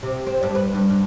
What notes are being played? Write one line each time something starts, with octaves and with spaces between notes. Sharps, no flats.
C3
C4
G2
B4
G2
G2